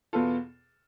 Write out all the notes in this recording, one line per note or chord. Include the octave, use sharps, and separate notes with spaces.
E2 B2 B3 F4 A4